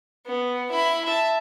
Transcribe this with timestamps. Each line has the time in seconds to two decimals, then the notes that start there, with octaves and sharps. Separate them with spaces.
0.26 B3
0.72 E4 B5
1.04 E5 A5